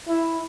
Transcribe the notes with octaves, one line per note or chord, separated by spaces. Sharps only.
E4